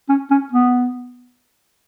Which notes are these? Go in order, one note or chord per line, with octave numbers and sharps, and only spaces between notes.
C#4
C#4
B3